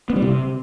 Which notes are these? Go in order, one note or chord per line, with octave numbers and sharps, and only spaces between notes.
B3
G3
C3